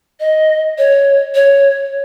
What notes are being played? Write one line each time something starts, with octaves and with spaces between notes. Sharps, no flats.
D#5
C#5
C#5